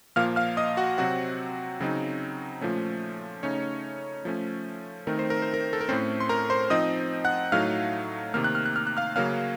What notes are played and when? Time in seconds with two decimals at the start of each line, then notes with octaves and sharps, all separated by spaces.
0.16 A#2 F3 A#3 F5 F6
0.36 F5 F6
0.57 D#5 D#6
0.77 F#4 F#5
0.98 C3 F#3 C4 F#4 F#5
1.80 C#3 F#3 C4 D#4
2.61 A#2 F3 A3 C#4
3.43 C#3 A3 C#4 D#4 C#5
4.25 F3 A3 C#4
5.07 D#3 A3 C4 D#4 A#4
5.19 C5
5.30 A#4
5.42 C5
5.54 A#4
5.73 A4
5.81 A#4
5.89 A2 A3 C4 C#4 C5
6.20 C6
6.29 A#4 A#5
6.50 C5 C6
6.70 F3 C4 D#4 D#5 D#6
7.25 F#5 F#6
7.52 A2 F#3 A3 D#4 F5 F6
8.34 C3 D#3 A#3 F6
8.44 F#6
8.55 F6
8.66 F#6
8.76 F6
8.87 F#6
8.97 F5 F6
9.16 C#3 F#3 A#3 C#4 F5 F6